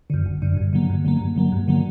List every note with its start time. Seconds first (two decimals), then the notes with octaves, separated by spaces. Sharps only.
0.10 F#2 D3
0.26 G1
0.42 F#2 D3
0.57 G2
0.73 D3 F#3 A#3
0.90 G2
1.05 D3 F#3 A#3
1.20 G2
1.36 D3 F#3 A#3
1.52 G2
1.68 D3 F#3 A#3